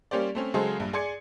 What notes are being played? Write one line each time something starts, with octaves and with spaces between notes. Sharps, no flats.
G3 A#3 C#4 G4 C5 D5
A3 C4 C#4
C#3 F#3 G#3 G#4 A4 C5
A#1 G2
G#4 D5 G#5 C6 G#6 C#7